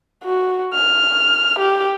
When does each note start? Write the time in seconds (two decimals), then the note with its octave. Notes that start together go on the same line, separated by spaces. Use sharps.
0.24 F#4
0.74 F6
1.59 G4